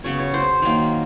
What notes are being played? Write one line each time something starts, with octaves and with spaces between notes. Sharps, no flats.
C#3 F#3 B3 C#5
C#5
C5
D#3 F#3 A#3